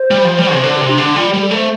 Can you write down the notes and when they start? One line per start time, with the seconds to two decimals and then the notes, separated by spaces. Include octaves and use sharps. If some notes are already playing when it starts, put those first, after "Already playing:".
Already playing: C5
0.11 G3
0.25 F3
0.38 G3
0.53 C3
0.63 D3 C5
0.76 C3 G4
0.89 D4
0.98 D3
1.03 D4
1.16 G3 F4
1.29 G3 G4
1.42 A4
1.51 A3 C5